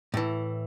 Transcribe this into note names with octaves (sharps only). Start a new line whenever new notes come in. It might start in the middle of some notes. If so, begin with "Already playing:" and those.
A2 E3